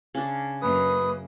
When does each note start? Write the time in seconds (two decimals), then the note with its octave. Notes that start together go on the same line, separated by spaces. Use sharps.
0.15 C#3 D4
0.62 F#2 A#3 B4 D#6